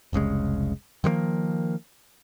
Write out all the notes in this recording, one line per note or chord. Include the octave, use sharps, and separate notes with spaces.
F1 C2 C#3 G#3
D#3 F3 G3 A#3